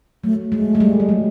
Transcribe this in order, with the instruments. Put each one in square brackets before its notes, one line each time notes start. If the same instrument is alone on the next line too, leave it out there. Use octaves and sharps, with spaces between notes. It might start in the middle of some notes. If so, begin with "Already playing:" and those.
[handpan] F#3 [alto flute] A3
[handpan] G#3 [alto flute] A3
[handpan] G#3
G3
G3
F#3